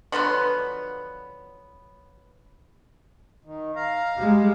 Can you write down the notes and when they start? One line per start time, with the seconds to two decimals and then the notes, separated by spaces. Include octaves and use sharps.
0.12 D3 F3 F#3 B3
3.45 D#3
3.76 F5 A#5
4.16 G3 G#3